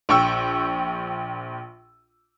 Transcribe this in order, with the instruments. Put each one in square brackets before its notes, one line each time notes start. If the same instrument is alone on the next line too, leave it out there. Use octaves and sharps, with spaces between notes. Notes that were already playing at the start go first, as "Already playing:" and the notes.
[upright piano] A#1 G5 C#6 E6